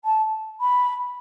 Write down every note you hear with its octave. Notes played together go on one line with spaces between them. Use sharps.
A5
B5